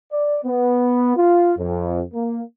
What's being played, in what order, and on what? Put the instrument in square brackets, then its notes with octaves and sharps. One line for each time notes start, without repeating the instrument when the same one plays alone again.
[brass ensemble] D5
B3
F4
F2
A#3